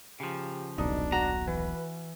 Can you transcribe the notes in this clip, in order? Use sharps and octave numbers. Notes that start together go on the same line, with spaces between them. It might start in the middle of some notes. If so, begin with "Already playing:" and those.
C#3 F3 G4
D#1 B1 B2 D4 D#4
F#4 A#5
E3 B4